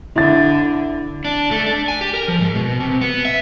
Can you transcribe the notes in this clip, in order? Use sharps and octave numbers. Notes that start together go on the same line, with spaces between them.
D3 E4 A6
D4
A3
D4
G#5
G4
A#4
F3
G#2
B2
C3
B3
E5